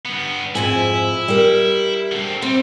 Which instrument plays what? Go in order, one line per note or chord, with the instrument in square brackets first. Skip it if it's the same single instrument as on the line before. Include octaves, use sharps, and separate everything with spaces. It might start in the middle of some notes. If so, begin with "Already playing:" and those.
[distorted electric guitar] G2 B3
[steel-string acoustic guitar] F2 G#2 G#5 [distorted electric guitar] E4
[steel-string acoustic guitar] G3 A#4
[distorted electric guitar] D3 C4
[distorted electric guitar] G3 [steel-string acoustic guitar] C4